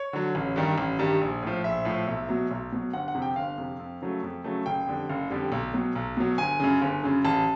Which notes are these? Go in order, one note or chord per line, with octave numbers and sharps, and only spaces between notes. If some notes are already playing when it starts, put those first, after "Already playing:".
Already playing: C#5
D3 F#3
A1
G2 D#3 G3
A1
G2 D#3 G3
A#1
A2 F3
A#1 E5
A2 F3
B1
B2 F#3
B1
B2 F#3
G1 F#5
F#5
F2 C3
G5
G1 F5
F2 C3
F2
C#3 F#3 A3
F2
C#3 F#3 A3
F#1 G5
F2 D3 G3
F#1
F2 D3 G3
B1
B2 F#3
B1
B2 F#3
G1 G#5
F#2 C#3
G1
F#2 C#3
A1 A5